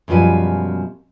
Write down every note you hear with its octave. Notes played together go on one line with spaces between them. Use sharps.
F#2 B2 F3 G3 G#5